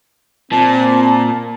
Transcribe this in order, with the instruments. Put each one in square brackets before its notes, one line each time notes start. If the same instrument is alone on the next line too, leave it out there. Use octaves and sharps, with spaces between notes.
[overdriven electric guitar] A#2 [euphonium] C4 [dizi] A5